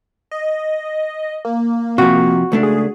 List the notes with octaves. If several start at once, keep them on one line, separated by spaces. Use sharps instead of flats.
D#5
A#3
C3 F3 F#4
C#2 A3 D4
G#4